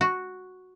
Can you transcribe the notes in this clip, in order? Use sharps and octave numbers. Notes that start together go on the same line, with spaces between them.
F#4